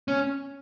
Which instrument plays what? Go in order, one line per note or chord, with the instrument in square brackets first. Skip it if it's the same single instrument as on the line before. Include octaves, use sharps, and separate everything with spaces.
[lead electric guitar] C#4